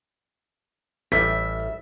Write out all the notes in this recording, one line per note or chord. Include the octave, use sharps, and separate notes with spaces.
A1 G3 E5 B6